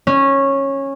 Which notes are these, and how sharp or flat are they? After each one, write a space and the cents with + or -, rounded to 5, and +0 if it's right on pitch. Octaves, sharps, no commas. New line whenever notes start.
C#4 -15